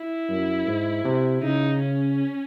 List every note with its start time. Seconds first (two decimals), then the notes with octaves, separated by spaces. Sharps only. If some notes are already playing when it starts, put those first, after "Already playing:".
Already playing: E4
0.29 F#2
0.67 G#2
1.04 C3
1.42 C#3 D#4
1.80 C#4